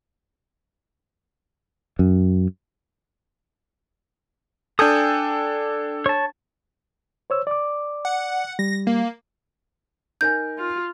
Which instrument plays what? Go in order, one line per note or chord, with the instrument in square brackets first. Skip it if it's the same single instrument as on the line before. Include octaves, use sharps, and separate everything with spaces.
[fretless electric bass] F#2
[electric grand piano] D4 A4 [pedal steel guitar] G5 G#5 D#6
[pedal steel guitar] C#5 A5
[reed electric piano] C5 C#5 E6
D5 D6
[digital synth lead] F#5
[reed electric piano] G3 [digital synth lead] A#6
[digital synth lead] A#3
[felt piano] D#4 A#4 G#5 [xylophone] G6
[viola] F4